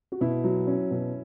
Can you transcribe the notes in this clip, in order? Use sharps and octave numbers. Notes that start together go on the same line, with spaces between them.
F#4
B2 E4
F#3
C#4
B2